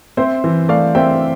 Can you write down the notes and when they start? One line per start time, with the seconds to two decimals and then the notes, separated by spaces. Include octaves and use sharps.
0.17 C4 C5 E5
0.44 E3
0.69 A3 D5 F5
0.95 C4 E5 G5